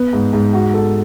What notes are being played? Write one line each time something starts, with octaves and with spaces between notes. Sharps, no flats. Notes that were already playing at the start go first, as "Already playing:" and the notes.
Already playing: B3
G#2
G#2
F#4
A4